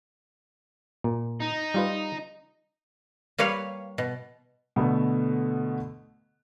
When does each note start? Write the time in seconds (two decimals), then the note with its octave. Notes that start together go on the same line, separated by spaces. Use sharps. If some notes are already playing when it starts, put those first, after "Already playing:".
1.04 A#2
1.42 D#4
1.74 G3 F4 B4
3.38 G3 A#3 B4 C#5 F5
3.98 B2
4.76 B2 D3 A3 B3